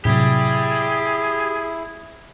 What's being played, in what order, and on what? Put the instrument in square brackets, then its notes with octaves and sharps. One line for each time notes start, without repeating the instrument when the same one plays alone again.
[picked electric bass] A2 C3 F#3 [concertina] E4 [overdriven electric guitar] G4 D5 [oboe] G#4